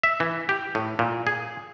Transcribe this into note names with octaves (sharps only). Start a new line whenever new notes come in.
E5
E3
G4
A2
A#2
G#4